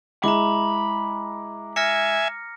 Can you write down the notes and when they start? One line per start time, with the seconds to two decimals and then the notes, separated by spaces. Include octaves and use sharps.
0.24 G#3 E4 A#5 B5 D6
1.76 E5 G#5 F6 A#6 C#7